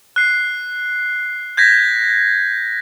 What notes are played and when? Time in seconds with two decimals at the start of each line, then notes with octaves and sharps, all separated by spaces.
0.16 F#6 C7
1.57 G6 G#6 A#6 B6